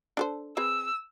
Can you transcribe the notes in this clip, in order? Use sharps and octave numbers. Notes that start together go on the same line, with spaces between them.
D4 A4 C5
C4 G#4 B4 E6